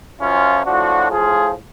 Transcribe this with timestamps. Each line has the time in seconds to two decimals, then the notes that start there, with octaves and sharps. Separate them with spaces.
0.20 F#2 F3 C#4 F4
0.65 A2 F3 D4 F#4
1.11 A2 F3 F4 G#4